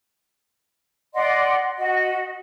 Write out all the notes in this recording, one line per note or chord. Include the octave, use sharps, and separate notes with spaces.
D5 D#5 F#5 C6
F#4 D#5